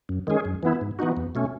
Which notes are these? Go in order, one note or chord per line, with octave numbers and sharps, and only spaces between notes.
F#2
D#3 G#3 C#4 G#4
F#2
E3 B3 E4
G#2
E3 B3 D#4 F#4
E2
B2 A3 C#4